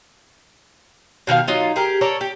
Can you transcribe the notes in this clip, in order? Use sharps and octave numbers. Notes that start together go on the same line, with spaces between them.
B2 D#3 A#4 F5
F#3 D#4 F4
G4 G#4 A#4
A4 A#4 C#5 D5
G4